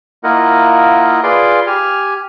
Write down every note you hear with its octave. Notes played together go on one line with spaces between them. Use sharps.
A#3 E4 F4 A#4 D#5 F#5
F4 G#4 B4 D5 C6 D6
G4 G#5 F6